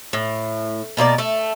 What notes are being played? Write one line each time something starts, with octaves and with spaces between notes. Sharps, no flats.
A2
B2 A#3 F#4 D5
A3